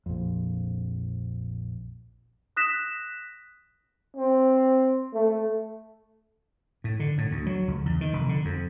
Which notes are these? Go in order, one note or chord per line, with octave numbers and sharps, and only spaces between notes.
A#1 F2
D#6 F#6 A#6 B6 E7
C4
A3
A2
D3
A2
D2
F#3
C#2
E2
D#3
F1
D3
F2